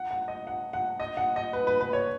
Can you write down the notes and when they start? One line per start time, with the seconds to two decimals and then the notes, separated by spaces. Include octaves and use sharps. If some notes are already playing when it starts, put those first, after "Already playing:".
Already playing: F#5
0.11 F#5
0.28 D#5
0.47 F#5
0.73 F#5
1.00 D#5
1.17 F#5
1.36 D#5
1.53 B4
1.67 B4
1.81 B4
1.93 C#5